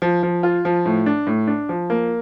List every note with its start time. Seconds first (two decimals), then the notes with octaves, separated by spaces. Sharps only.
0.02 F3
0.23 F3
0.43 F4
0.65 F3
0.86 A2
1.06 D4
1.27 A2
1.47 D4
1.69 F3
1.90 A#3